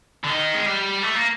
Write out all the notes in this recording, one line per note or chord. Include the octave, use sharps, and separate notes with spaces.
D3
D#3
G#3
G3
A3
A#3